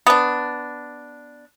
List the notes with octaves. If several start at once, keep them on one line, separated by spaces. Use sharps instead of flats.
B3 D4